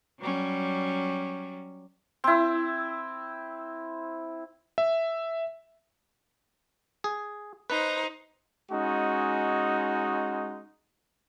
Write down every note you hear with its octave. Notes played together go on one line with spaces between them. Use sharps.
F#3 G3 C#4
C4 E4
E5
G#4
D#4 B4 C5
G#3 C#4 D#4 F#4